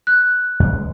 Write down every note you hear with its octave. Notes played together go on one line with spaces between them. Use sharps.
F#6
F2 C#3 G3
C#2 G#3